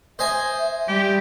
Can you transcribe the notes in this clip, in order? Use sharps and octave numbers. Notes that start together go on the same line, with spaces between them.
C5 D#5 E5 G#5
G3 G4